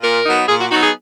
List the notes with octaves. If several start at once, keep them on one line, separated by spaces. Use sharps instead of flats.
A#2 A#4
F#3 B3 D#4
A#2 G#4
F#4
F#3 B3 D#4 F#4
G#4